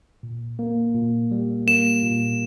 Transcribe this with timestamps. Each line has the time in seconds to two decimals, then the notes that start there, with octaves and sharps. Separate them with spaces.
0.23 A#2
0.59 A#3
0.95 A#2
1.31 G3
1.67 A#3 E7
2.03 A#2